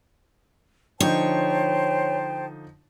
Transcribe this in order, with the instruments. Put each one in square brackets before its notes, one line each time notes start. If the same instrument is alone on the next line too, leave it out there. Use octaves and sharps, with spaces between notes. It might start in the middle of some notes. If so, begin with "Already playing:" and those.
[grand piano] D3 F3 D#4 [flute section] C5 G5 A5 [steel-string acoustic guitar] C#5